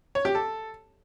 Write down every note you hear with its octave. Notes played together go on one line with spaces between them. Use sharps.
C#5
G4
A4